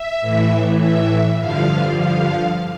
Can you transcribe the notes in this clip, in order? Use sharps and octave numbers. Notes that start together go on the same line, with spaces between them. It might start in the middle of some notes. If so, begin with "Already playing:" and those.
Already playing: E5
A2 E3
E5
G2 D3 F3 F5
F5